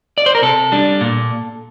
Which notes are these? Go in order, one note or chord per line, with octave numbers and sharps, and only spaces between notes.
D5
C5
A#4
C3 A4
G3 D4
A#2